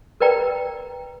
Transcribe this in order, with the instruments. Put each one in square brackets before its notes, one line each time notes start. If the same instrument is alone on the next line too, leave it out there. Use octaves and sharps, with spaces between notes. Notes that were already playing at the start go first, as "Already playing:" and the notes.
[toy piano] A#4 B4 D5 G5 A#5